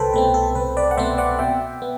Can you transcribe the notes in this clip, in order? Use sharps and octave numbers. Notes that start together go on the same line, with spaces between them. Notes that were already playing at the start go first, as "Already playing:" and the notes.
Already playing: C2 A4 B4 C5 G5 B5
B2 A3 C4 B4
A4
C2 B4
B4 D5
F#5
B2 A3 C4 C5 E5
D5 F#5
B2 E5 G5
B3